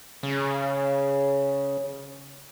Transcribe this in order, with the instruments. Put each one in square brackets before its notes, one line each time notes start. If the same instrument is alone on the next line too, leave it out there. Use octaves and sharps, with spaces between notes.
[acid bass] C#3